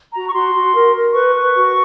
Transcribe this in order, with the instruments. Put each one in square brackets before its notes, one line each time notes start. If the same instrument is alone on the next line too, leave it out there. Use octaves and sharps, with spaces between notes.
[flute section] F#4 A#5
C#6
F#4 C6
F#4
A#4
A#4
B4 C#6
B4
F#4